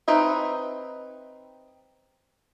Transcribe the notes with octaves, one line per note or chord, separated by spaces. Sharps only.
C4 D#4 B4 E5